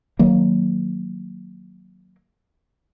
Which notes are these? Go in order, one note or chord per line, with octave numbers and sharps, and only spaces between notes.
D#3 F#3 A#3